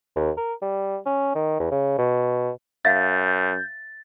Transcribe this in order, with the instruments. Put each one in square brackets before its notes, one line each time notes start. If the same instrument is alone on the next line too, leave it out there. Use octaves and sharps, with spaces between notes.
[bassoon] D#2
A#4
G3
C#4
D#3
E2
C#3
B2
[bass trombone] F#2 [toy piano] E5 F5 [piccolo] G6 [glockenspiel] A6